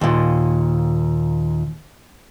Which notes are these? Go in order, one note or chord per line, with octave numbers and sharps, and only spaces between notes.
D#2 A#2